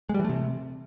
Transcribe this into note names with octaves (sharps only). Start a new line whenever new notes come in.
G#3
G3
E3
A3
C3